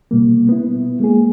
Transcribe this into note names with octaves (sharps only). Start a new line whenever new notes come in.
B2 G3 A#3
B3 E4
G#3 A#3 G#4